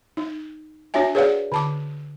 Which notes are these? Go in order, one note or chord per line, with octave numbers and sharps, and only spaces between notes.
D#4
D4 F#4 C#5 E5 G#5
G#4 B4 C#5 D5 F5 F#5
D3 A5 D6